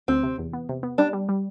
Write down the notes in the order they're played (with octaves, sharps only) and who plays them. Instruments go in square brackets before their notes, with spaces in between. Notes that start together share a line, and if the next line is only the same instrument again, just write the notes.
[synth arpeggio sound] D2 [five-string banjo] C4
[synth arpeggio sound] C3
E2
B3
C3
B3
[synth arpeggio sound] G3 [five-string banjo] D4
[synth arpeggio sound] G3
G3